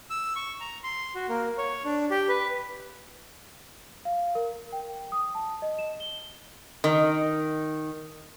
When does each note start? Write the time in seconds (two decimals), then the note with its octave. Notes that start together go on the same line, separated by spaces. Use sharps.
0.10 E6
0.36 C#6
0.60 A#5
0.84 C6
1.15 F#4
1.29 A#3
1.58 C#5
1.85 D4
2.11 G4
2.29 B4
4.05 F5
4.35 A#4
4.73 G5
5.12 D#6
5.35 A5
5.62 D#5
5.79 E7
6.00 G7
6.84 D#3